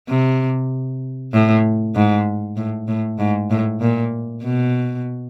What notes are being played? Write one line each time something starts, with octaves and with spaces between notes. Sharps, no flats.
C3
A2
G#2
A2
A2
G#2
A2
A#2
B2